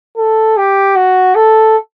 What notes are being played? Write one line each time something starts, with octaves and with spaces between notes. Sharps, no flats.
A4
G4
F#4
A4